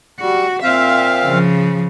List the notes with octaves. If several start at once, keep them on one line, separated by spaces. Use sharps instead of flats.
G3 F#4
A#2 C4 E5 F5
C#3 F3